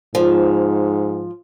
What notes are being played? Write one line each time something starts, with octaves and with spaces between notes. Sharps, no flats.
G#2 F3